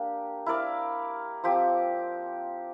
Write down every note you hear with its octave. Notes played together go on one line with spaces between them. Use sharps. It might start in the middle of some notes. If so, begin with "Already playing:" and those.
Already playing: A#3 D4 G4
E4 A#4 D5 F5
F3 C4 G4